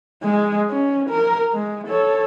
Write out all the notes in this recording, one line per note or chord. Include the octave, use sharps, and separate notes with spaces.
G#3
C#4
A#4
G#3
A4 C#5